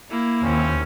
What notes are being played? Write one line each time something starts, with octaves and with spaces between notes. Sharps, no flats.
A#3 E4
D#2 C4 C#4